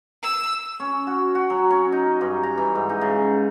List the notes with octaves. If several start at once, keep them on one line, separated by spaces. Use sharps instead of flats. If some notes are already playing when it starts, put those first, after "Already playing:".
E6
C#4
F#4
F#4
F#3
C#4
D#4
G2
A#5
E3
G#2
D#4
C#3